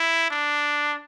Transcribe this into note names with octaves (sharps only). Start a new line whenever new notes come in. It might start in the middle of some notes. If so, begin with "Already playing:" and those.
Already playing: E4
D4